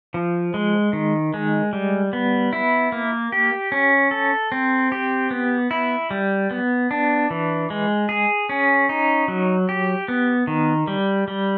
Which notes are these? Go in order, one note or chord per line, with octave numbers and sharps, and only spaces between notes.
F3
G#3
D#3
G#3
G3
B3
E4
A#3
G4
C#4
A4
C4
G4
B3
E4
G3
B3
D4
E3
G#3
G#4
C#4
D#4
F#3
G4
B3
D#3
G3
G3